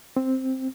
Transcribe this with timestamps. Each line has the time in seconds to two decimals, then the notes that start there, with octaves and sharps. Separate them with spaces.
0.17 C4